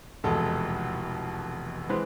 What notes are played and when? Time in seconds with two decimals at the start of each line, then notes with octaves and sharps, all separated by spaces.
0.24 F1 E2 B2 G#3 A4
1.89 E3 G#3 C4 B4